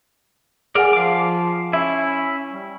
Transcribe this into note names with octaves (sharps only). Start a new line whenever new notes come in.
G#4 A#4 D5 F#5 G#5
F3 F5 D6
C#4 E4 E5
G3